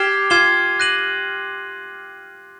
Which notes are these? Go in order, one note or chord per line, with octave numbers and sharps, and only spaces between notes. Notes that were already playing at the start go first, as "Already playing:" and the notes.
Already playing: G4 F6 G#6 C7 E7 G7
F4 F6 G#6 C7 E7 G7
F#6 A#6 D#7 F#7